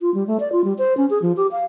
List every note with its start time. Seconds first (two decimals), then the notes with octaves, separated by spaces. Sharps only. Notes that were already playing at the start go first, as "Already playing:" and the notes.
0.01 F4
0.14 G3
0.27 A3
0.40 D5
0.52 F4
0.64 G3
0.78 C5
0.97 C#4
1.10 G#4
1.22 F3
1.37 G4
1.51 F5